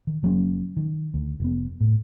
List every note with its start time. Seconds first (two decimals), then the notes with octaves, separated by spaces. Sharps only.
0.07 D#3
0.23 F#1 F#3 A#3 C#4
0.77 D#3
1.14 D2
1.40 F1 B3
1.81 A2